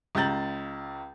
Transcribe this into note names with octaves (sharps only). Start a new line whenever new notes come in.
C#2 C#3 A#5 G6 A6 F#7